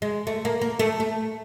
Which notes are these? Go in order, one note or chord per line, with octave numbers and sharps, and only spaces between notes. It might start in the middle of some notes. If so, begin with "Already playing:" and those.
G#3
A3
A#3
A#3
A3
A3